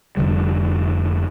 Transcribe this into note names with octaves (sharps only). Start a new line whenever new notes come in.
F1 D3 G3